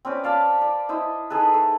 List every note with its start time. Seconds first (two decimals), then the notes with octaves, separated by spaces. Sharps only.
0.05 C4 C#4 B4 D5
0.24 D5 F5 A5 B5
0.61 D5
0.89 E4 C5 D#5
1.30 D#4 G#4 A4 B4
1.54 A3